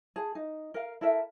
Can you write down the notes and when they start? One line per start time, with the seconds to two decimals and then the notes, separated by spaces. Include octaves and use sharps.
0.16 G#4 A5
0.35 D#4
0.74 A#4 F5
1.01 E4 A4 A#4 E5